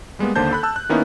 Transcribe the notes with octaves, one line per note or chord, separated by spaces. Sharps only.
G3 G#3 A#3 B3
D#2 D3 A#3 C5 A5 G6
A4 B5 F#6
A5 E6
F#6
D#3 A#3 B3 C#4 D#4 E4